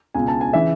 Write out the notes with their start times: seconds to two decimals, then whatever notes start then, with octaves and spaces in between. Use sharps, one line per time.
0.14 C#2 B2 G#5
0.28 A5
0.41 G#5
0.53 C#3 E3 E5